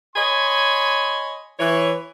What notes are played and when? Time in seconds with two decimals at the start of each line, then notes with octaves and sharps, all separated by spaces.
0.16 C#5 D#5 G#5 B5 C6
1.59 E3 C#5